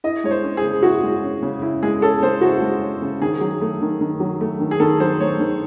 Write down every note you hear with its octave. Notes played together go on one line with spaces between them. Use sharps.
E4 D#5
G#3 C#5
C5
C#4
G#4
C#3
E4 F#4
G#3
C#4
C#3
E4
G#3 G#4
C#4 A4
C#3 C5
E4 F#4
G#3
C#4
C#3
D#3 G#4
F#3
A3
D#3
D#3
F#3
A3
D#3
G#4
D#3 A4
F#3 C5
A3 C#5
D#3